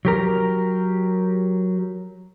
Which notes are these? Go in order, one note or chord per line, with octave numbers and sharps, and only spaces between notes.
F#3 G4 A#4